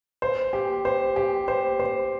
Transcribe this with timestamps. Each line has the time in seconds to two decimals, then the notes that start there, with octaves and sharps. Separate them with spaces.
0.22 C5
0.53 G4
0.85 C5
1.16 G4
1.48 C5
1.80 C5